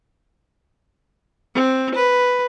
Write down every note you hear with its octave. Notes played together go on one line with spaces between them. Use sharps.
C4
B4